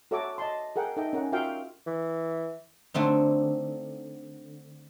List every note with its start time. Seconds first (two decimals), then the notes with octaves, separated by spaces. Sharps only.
0.11 F#4 A4 C#5 E5 A#5 D6
0.38 D#5 A5 C6
0.76 G#4 A#4 F#5 G5
0.97 D#4 A4 D#5 E5 G5
1.13 C#4 A#4 F#5
1.32 F4 F#4 A#4 E5 F5 G5
1.87 E3
2.94 D3 A3 C4 D#4